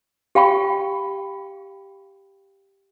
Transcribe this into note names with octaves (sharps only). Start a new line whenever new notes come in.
G4 F5 G5 B5 C#6